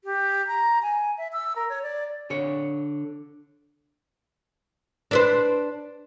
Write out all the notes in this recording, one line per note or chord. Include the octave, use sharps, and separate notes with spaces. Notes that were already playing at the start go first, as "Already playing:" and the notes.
G4
A#5
G#5
E5
E6
A#4
C#5
D5
D3 C#5
D4 B4 C5